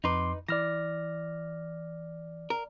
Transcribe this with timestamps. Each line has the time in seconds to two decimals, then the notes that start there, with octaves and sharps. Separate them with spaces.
0.04 F2 D#4 B4 C6 D6
0.48 E3 D5 F6 A#6
2.50 A#4